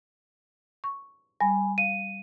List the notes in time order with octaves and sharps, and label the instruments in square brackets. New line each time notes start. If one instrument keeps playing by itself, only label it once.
[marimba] C#6
[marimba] G3 [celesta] G#5 B5
[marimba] F5 [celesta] D#7